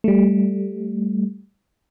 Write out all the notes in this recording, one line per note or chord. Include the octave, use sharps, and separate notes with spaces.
G3 A3